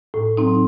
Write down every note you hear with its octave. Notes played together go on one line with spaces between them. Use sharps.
A2
F#3 C4 D#4